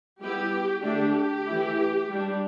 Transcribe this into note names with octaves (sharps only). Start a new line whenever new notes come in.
G3 B3 E4 G4
D3 A3 D4 G4
E3 A3 E4
G3 D4